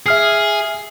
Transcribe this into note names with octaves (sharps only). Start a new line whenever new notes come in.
G#4 E5 F6 C7